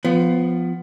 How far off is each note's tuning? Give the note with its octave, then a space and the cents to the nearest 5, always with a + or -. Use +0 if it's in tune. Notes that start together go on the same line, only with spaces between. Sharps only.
F3 +0 B3 +20